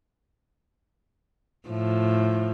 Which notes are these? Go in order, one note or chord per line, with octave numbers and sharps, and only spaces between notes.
A2 F3